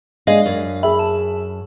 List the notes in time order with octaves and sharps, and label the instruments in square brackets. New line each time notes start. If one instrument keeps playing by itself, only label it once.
[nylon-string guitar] G#3 G#4 D#5 [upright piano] D4 [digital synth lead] F5
[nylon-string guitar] F#2
[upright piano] G#4 E5 [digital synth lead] B5
[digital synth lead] A5